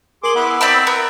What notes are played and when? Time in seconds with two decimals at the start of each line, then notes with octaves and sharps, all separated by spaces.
0.24 G#4 A#4 C6 D6 F#7 G7
0.35 B3 E4 F#5
0.61 C4 E4 D5 E5 B5
0.87 B3 A#4